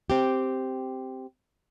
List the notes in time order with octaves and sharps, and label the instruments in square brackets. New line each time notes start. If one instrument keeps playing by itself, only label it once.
[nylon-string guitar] C4 G4